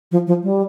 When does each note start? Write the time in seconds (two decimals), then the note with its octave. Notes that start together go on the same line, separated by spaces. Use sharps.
0.12 F3
0.27 F3
0.43 G3